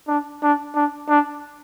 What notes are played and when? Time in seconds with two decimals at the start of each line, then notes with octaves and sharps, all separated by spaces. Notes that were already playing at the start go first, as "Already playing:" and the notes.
0.08 D4
0.43 D4
0.75 D4
1.09 D4